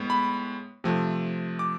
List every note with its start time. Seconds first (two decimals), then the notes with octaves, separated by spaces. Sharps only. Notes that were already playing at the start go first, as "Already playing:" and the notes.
Already playing: A2 G#3 B3
0.10 B5
0.84 C3 F3 A3
1.59 D6